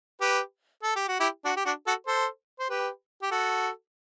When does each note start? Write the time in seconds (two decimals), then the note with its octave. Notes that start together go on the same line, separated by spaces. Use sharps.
0.21 G4 B4
0.83 A4
0.96 G4
1.08 F#4
1.20 E4 G4
1.45 D4 F#4
1.57 G4
1.65 D4 F#4
1.87 F#4 A4
2.07 A4 C5
2.59 C5
2.70 G4 B4
3.22 G4
3.31 F#4 A4